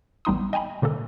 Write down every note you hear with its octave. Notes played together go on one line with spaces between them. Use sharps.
A1 G3 B3 D#4 C6 D#6
D#5 G5 G#5 A#5 B5
B2 D3 A#3 A4